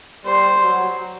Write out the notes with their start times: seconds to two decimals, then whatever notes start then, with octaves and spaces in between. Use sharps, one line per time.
0.25 G3 C5
0.62 F#3